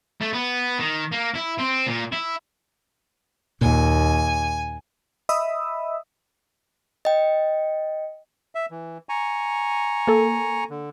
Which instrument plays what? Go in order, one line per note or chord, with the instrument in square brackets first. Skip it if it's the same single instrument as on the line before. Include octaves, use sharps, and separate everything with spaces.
[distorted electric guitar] A3
B3
D#3
A#3
E4
C4
A#2
E4
[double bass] D#2 [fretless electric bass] A#2 [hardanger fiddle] G#5
[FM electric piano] D#5 E5 B5 D#6 E6
[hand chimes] D#5 G5
[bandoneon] E5
E3
G#5 A#5 C#6
[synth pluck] A#3 A4
[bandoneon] D3